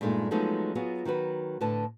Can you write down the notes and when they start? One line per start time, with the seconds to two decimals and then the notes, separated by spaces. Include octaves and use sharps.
0.01 G2 A#2 G#3 A3 D#4
0.31 F3 F#3 G#3 A3 B3 D#4
0.75 F#3 B3 F4 F#4 G#4
1.05 D#3 F#3 F#4 B4
1.61 A2 D3 B4 A5